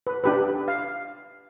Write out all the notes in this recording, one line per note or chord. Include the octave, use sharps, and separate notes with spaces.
B4
D4 G4 B4
F5